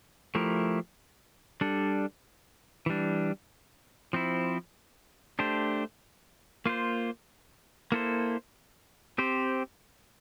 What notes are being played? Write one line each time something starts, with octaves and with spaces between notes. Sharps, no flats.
F3 A3 E4 G4 A#4
G3 D4 A4
E3 G3 D4
F3 C4 E4
A3 D4 G4 C5
A#3 F4 C5
A#3 E4 A4 C5
C4 G4 C5